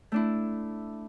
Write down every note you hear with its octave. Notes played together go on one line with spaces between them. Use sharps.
A3 D4 E4